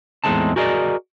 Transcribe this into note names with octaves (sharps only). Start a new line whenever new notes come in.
E2 A2 G#3 C4 D#4 A5
F#4 G#4 A#4 D5 D#5